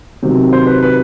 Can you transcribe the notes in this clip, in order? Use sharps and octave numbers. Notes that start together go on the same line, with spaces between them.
C3 D#3 F#3
C5
B4
B4